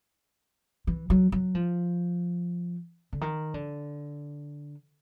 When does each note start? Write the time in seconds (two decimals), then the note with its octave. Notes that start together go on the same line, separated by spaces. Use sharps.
0.87 E3
1.10 F#3
1.32 F#3
1.55 F3
3.13 D3
3.21 D#3
3.54 D3